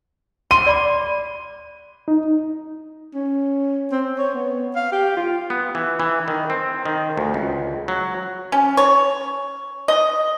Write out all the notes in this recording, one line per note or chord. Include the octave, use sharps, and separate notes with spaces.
C6 D#7
D5 B5 D6
D#4
C#4
C4
C#5
B3
F5
G4
F4
B3
E3
E3
D#3
C4
D#3
D2
C#2
F#3
C#4
C#5
D#5